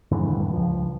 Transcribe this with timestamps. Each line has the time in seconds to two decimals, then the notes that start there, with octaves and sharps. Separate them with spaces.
0.11 F2 G#2 D3 E3
0.31 D#1 G2
0.53 C#2 F3